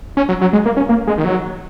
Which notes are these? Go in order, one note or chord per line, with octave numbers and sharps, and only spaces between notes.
C#4
F#3
F#3
G#3
A#3
C#4
A#3
G#3
D#3
F#3